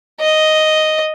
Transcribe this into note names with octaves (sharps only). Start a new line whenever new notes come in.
D#5